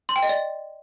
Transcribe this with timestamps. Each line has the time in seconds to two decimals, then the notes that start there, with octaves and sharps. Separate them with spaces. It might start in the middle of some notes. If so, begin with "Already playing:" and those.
0.09 C6
0.16 G5
0.23 D#5
0.29 D5